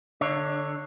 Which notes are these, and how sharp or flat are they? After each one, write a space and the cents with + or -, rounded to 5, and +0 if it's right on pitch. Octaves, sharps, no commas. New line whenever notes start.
D3 +0 D4 +30 C#5 +0